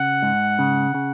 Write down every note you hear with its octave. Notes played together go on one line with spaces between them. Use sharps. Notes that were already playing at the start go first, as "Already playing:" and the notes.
Already playing: C#3 F#5
G#2
C#3
C#3